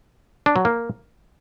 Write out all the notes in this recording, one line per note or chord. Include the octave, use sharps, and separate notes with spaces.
D4
F#3
A#3